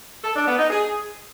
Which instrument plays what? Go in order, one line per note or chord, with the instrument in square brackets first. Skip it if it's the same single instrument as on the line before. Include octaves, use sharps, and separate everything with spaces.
[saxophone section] A4
D4
B3
D#4
G#4